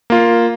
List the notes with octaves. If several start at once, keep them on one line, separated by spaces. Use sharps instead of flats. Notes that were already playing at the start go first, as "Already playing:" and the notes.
A#3 F4